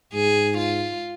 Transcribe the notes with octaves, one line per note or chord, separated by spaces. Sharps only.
G#2 G#4
F4